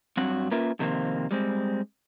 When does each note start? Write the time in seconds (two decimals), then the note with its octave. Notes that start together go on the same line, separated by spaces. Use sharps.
0.17 G2 F#3 C4 F#4
0.51 A#3 C#4 F4 A#4 B4 E5
0.79 F2 C3 D#3 A#3 C4
1.31 G3 G#3 C4